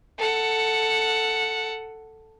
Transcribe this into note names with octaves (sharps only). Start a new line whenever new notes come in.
A4 F#5